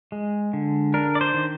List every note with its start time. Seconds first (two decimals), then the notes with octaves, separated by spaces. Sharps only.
0.12 G#3
0.53 D3
0.94 D4 A#4
1.15 D5
1.21 C5
1.34 D#3